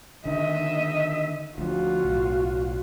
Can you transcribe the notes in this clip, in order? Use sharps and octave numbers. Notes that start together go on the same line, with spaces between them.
D3 D#3 D#5 E5
D2 F3 F4 F#4
B1 A2